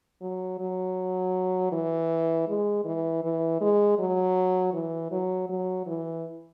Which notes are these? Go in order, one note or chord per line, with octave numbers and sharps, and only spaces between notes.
F#3
F#3
E3
G#3
E3
E3
G#3
F#3
E3
F#3
F#3
E3